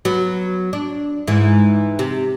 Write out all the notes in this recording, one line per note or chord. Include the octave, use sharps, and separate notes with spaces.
F#3 B3
D4
G#2 E3
C3